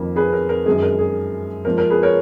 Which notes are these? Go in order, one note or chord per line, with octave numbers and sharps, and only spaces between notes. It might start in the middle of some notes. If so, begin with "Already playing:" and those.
Already playing: F2 D#3 A#3
G#4 B4
A#4
A#4
F#2 D#3 G#3 G#4
A#4
G#4
G#2 F3 A#3 A#4
A#4
G#4 B4
A#4 C#5